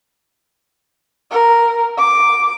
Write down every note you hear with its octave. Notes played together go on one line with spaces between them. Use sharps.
A#4
D6